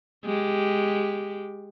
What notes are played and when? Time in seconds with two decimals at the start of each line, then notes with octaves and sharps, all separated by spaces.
0.25 G#3 G4